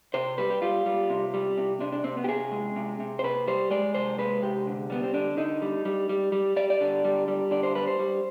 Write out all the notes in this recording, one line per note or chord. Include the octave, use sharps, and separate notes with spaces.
C3 C5
G3 B4
G4
G3 F4
G3
C3
G3
C3
C3 D4
D4
C3 C4
B3
G4
C3 G#4
G#3
C3
C3
C5
C3 B4
G3 C5
G#3 D5
C3 C5
G#3 B4
C3 G4
D3
G3 B3
C4
D3 D4
D3 D#4
G3
G3
G3
G3
G3 D5
D5
D3
G3
G3
D3 D5
C5
G3 B4
C5
G3